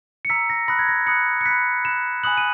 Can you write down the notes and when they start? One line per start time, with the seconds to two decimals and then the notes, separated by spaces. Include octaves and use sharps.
0.25 C#7
0.30 A#5 E6 B6
0.50 A#6
0.68 B5 D#6 F#6 A#6
0.79 G#6
0.89 A#6
1.07 B5 D#6 F#6 C#7
1.41 C#7
1.46 B5 F#6 B6
1.85 B5 F#6 E7
2.23 G#5 B5 D#6 F#6 F#7
2.37 D#7